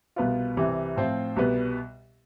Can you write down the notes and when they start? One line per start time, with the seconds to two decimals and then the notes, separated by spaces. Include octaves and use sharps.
0.16 C2 B2 B3 F4
0.57 C2 C3 E3 G3
0.96 A2 F3 C4 F4 C5
1.36 C2 B2 G3 B3